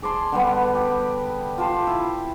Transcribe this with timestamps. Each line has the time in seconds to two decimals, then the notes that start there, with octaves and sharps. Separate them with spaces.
0.02 G#4 D5 A5 C6
0.32 D3 G3 B3
0.75 G4
1.58 F4 G4 A5 C6
1.87 E4